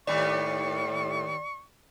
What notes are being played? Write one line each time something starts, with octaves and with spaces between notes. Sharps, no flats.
D#2 A2 G3 D5 C#6